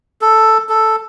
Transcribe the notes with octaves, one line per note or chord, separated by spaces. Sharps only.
A4
A4